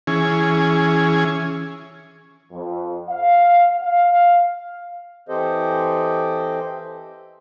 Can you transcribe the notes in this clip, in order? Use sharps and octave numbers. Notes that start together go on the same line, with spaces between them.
E3 C#4 G#4
F2
F5
F5
E3 C4 G4 A4 C5 D#5